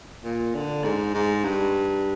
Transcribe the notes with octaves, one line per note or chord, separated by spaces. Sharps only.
A#2
D3
G#2
G#2
G2